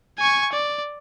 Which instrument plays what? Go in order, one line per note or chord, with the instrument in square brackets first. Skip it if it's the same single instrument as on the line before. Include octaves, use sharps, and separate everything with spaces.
[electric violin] G#5 C#6
D5